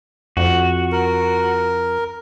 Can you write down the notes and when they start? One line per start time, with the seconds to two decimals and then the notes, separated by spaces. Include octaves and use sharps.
0.37 F2 F#4
0.92 A#4